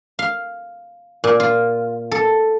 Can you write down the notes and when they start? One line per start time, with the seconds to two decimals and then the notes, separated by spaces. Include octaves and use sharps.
0.19 F5
1.24 A#2
1.40 F4
2.11 A4